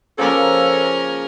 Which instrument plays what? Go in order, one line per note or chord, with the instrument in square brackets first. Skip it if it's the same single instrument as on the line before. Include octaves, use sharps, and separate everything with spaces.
[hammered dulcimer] C#3 F3 A#3 [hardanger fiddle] C#4 A#4 [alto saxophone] A4